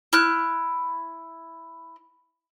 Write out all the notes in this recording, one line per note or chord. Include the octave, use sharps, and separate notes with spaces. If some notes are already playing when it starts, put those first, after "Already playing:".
E4 F6 F#6